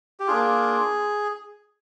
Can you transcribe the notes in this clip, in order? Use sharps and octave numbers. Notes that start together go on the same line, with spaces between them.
G4
A#3 D4 F4 G#4